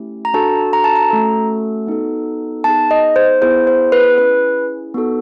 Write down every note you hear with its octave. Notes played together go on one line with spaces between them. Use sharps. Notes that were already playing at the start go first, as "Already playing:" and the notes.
Already playing: A3 C#4 E4 G4
A#5
D4 F#4 A4 A5
A#5
A5
A#5
A3 C#4 F#4 A4
B3 D#4 F#4 A4
B3 D#4 G#4 A5
D#5
C5
B3 E4 G#4 C5
C5
B4
C#4 E4 G#4 B4
B3 D#4 F#4 A4